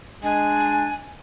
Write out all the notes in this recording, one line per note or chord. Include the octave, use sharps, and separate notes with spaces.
G#3 D4 G#5